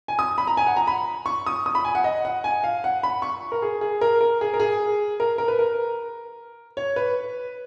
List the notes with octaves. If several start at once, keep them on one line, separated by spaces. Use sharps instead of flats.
G#5
D#6
B5
A#5
G#5
F#5
A#5
B5
C#6
D#6
D#6
B5
G#5
F#5
D#5
F#5
G#5
F5
F#5
B5
C#6
A#4
G#4
G#4
A#4
A#4
G#4
A#4
G#4
A#4
A#4
B4
A#4
C#5
B4